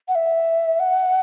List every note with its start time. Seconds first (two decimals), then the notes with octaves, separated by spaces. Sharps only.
0.08 F#5
0.15 E5
0.80 F#5